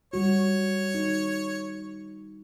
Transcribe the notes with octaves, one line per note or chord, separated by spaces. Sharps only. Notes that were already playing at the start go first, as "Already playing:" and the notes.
G3 F#4 C#5
D#4